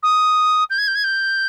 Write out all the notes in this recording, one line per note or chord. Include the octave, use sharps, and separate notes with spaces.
D#6
G6
G#6
G6
G#6
G6